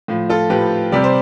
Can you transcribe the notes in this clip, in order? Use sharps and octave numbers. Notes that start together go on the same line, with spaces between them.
A2 F3
F4 A4
A2 F3 G4 B4
C3 G3 D5
C5